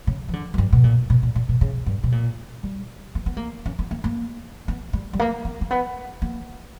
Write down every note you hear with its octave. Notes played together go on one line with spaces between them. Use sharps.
C#3
E3
D3
F#2
G2
B2
A#2
B2
A#2
A#2
B2
C#3
G2
B2
A#2
G3
A#3
B3
A#3
C#4
B3
A#3
A#3
B3
G3
G3
A#3
B3
A#3
B3
A#3